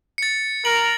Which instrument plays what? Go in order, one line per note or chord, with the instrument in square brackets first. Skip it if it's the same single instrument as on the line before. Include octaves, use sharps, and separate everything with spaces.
[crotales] A6 C#7
[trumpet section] A#4 [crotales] F#7